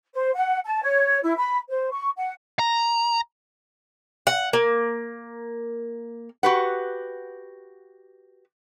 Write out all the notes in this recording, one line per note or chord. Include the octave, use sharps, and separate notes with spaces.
C5
F#5
A5
C#5
E4
B5
C5
C#6
F#5
A#5
F#5
A#3
F#4 G4 B4 F#5